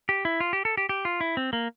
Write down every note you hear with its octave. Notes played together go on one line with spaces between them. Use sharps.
G4
E4
F4
G4
A4
G4
G4
F4
E4
C4
A#3